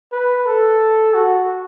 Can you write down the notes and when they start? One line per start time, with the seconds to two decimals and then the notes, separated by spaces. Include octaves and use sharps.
0.12 B4
0.46 A4
1.14 F#4